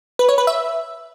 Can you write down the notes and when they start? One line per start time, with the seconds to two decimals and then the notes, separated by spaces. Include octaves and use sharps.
0.19 B4
0.29 C#5
0.38 B4
0.47 E5